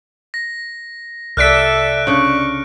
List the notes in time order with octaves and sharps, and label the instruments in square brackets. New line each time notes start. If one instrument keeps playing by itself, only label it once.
[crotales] A#6
[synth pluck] C2 D5 B6 [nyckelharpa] A4 E5 [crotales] F6 F#6 D7
[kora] C#3 D4 [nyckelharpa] C#6